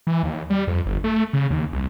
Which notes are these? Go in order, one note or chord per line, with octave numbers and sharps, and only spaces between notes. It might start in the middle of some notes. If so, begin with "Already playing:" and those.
E3
D#2
G3
F2
G1
A3
C#3
D#2
C2